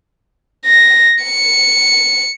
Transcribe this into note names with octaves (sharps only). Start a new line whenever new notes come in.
A#6
C#7